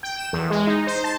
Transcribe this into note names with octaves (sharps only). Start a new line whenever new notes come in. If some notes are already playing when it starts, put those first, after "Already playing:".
G5
E7
E2
G#3
D#4
C5
A5